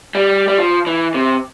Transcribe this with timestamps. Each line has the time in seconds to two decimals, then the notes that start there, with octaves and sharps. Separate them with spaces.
0.15 G3
0.48 G3
0.58 F3
0.87 E3
1.14 C3